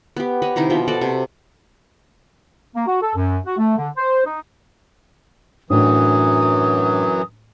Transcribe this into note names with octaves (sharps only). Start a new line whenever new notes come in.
B3 G4
B4 C#5 D#5
C3 D#3 D#4 E4
B2 F3 E5 G5
F#4 A4 D5
C3
A#3
F#4
A4
F#2
F#4
A3
D3
C5
D#4
F#2 A2 E3 F#3 D4 D#6